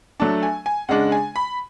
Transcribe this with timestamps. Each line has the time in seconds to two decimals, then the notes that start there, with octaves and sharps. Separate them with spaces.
0.20 F#3 A3 D4 A5
0.43 G#5
0.66 G#5
0.89 C#3 G#3 D4 F#5
1.12 G#5
1.36 B5